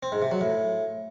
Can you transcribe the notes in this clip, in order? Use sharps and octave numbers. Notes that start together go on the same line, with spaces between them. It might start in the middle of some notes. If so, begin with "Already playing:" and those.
C4
G#2
C3
F#3
A2